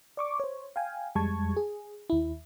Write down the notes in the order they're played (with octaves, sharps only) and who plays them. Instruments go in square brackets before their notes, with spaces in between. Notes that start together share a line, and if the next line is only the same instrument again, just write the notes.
[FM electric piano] D5 C#6 D6
C5 C#5
F5 G5 G#5
F2 G3 G#3 A5 C#6 G#6
G#4
D#2 E4